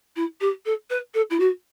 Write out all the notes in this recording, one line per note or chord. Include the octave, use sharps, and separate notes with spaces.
E4
G4
A4
B4
A4
E4
F#4